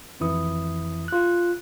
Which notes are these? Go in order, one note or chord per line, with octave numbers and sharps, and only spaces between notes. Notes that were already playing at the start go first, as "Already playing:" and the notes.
G#1 F2 E3 E4 D#6
F4 F#6